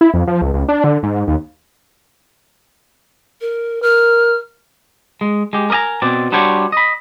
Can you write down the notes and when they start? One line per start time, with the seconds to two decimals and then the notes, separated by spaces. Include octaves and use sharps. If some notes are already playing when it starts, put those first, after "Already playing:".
0.01 E4
0.14 F2
0.27 F3
0.42 C#2
0.54 C#2
0.69 D4
0.84 D3
1.03 G#2
1.28 D#2
3.41 A#4
3.82 A#4 F6
5.21 G#3
5.53 G#3 G4
5.70 A#4 D5 D#5 G#5 A#5
6.02 B2 C4 D5
6.32 G3 D4 F#4 C5 C#5
6.72 D#5 B5